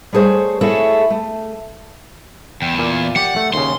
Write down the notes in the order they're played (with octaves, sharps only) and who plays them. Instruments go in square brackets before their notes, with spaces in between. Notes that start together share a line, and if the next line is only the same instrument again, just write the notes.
[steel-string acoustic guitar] G3 A3 G#4 C5 C#5
A3 E4 F#4 G#4 A4 C#5
A3
[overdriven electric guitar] E2 [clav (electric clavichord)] G5
[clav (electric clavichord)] A#2 D5 F5
[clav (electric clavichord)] G4 D5 [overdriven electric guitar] F#5
[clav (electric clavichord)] A3
[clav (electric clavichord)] D#2 C#3 [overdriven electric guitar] C6